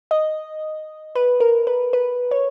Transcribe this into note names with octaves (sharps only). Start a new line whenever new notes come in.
D#5
B4
A#4
B4
B4
C#5